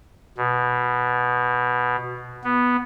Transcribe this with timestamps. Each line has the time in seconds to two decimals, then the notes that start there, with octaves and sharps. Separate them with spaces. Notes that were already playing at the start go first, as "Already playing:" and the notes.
0.37 B2
2.44 B3